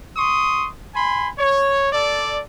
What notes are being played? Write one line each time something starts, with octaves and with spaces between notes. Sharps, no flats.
C6 C#6 D#6
G#5 B5 C6
C#5
A4 D5